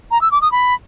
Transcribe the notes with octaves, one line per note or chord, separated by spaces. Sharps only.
A#5
E6
D6
D#6
B5